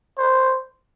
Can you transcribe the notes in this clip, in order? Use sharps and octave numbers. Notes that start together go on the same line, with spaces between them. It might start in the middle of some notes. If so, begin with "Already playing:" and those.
C5